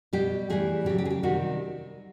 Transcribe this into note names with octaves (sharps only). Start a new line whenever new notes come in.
B2 G3 G4
A2 E3 G3 G#4
C#3 F#3 G4
G4
G#4
G4
C3 D#3 G3 F#4